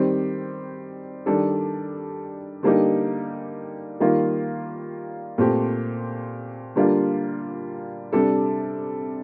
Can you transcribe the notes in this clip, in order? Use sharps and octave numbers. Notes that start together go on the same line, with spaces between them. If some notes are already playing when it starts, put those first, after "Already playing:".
Already playing: D#3 G3 C4
D#3 G3 D4 A4
D3 G3 A#3 D#4 G4
D#3 G3 A#3 F4
A#2 A3 C4 G4
D3 G3 A#3 F4
C3 G3 D4 A4